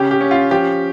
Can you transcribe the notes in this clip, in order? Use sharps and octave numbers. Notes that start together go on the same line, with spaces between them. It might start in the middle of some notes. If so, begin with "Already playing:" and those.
Already playing: C#3 C#4 G4
G4
C#4
F4
F3 G4